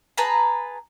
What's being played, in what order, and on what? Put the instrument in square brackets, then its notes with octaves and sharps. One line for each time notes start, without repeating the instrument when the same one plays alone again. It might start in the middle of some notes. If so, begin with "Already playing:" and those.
[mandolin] G#4 B4 A5 A#5